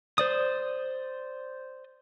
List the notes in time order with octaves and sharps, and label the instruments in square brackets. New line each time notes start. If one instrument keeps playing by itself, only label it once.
[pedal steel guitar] C5 D5 D#6